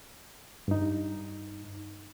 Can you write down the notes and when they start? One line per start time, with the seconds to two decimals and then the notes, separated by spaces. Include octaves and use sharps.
0.68 G2 D#4